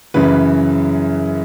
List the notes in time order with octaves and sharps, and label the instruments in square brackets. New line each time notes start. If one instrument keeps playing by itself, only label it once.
[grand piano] F#2 C#3 E3 B4